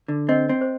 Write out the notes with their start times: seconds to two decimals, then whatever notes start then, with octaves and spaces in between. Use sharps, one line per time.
0.08 D3
0.29 C4 D#5
0.49 C4
0.61 C5